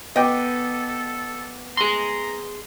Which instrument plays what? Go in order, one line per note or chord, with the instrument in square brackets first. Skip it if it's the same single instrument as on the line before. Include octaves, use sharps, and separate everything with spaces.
[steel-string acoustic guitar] B3 [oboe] A4 [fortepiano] D#5 G5 D6
[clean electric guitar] G#4 C6 [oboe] A#5